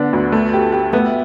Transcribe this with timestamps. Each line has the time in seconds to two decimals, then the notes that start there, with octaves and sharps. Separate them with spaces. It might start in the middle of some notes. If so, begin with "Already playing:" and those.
Already playing: D3 B3 D4
0.13 D2
0.32 A3
0.53 G4
0.72 G4
0.92 A3 B3